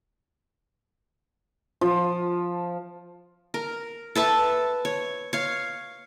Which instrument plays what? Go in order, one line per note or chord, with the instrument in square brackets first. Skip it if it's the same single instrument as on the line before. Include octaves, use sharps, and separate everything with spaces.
[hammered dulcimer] F3
[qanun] A#4
A4 B4 E5 A5
C#5
C#5 F5